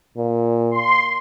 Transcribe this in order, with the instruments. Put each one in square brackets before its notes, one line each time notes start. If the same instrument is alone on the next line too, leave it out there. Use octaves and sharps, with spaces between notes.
[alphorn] A#2
[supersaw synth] C6